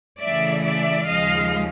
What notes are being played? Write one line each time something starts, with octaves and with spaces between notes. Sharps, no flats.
C#3 E3 A3 D5 E5
D5 E5
D#2 C#3 F3 G#3 D#5 F5